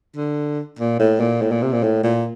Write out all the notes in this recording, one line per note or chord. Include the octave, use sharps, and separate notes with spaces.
D3
A#2
A2
A#2
A2
A#2
C3
A#2
A2
A#2